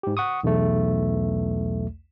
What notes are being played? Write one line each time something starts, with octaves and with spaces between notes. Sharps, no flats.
G#2 G4
F#5 C#6 D#6
B1 E2 A3